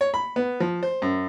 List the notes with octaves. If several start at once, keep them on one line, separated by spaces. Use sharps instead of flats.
C#5
B5
B3
F3
C5
F#2